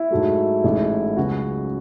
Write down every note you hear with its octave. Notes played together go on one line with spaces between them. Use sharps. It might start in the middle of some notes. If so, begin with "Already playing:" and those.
Already playing: E4
G#2 F#3 A3
A1 G#2 F#3 A3
C#2 C#3 F#3 B3 F#4